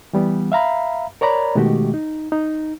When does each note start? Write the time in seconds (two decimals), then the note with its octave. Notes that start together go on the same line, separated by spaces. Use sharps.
0.13 E3 G3 B3
0.52 E5 F5 A#5 B5
1.21 A#4 C#5 D5 A#5 B5
1.55 B2 D#3 G#3 A3 F#4 G4
1.94 D#4
2.32 D#4